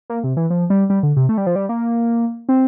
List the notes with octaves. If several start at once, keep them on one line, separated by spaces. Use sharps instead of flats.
A#3
C3
E3
F3
G3
G3
D3
C3
A3
G3
F3
G3
A#3
C4